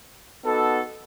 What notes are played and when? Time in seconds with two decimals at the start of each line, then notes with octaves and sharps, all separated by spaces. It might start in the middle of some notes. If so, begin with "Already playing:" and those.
0.45 B3 D#4 F#4 A4